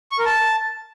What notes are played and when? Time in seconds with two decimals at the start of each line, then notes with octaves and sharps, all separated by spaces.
0.12 C#6
0.19 A#4
0.26 A5